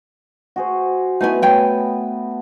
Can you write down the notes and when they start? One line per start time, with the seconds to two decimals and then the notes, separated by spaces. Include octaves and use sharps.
0.56 F#4 G#4 C5
1.21 A3 B3 D#4 E4 G#5
1.42 C#5 G5 G#5